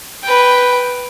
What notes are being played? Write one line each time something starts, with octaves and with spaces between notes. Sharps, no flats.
B4 G5